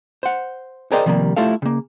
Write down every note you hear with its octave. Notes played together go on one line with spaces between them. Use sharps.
C5 F#5
G#4 A#4 C5 D5 D#5 G5
C3 D#3 F3 G3 A3 A#3
A3 E4 F4 G4 A4 F5
C#3 A#3